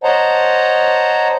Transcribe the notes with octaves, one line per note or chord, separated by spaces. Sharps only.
C5 C#5 D#5 F#5 A5 A#5